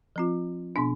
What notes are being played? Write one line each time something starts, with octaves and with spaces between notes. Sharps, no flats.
F3 C4 F4
B2 B3 D4